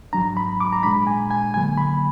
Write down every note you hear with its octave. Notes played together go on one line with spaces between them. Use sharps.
G#2 F#3 D4 A#5
B5
D6
A#5
A#2 G#3 D4 B5
G#5
G#5
D#2 D3 F#3 A#3 G#5
B5